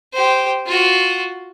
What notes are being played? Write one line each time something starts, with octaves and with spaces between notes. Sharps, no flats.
G4 C5
F4 F#4